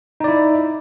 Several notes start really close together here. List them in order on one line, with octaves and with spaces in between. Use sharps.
D#4 D5 E4